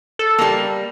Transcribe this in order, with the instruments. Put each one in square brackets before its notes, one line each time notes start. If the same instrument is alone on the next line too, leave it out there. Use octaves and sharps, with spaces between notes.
[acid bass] A4
[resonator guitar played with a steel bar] G3 A#3